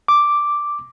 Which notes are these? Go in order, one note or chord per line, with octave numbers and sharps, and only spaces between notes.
D6